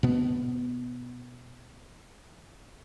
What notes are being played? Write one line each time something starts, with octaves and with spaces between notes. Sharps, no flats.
B2 B3